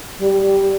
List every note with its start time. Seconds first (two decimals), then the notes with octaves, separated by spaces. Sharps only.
0.19 G3
0.42 G3